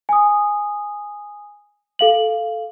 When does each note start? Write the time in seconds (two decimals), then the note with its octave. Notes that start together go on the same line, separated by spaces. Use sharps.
0.09 G#5 D#6
1.99 A4 F5 F#7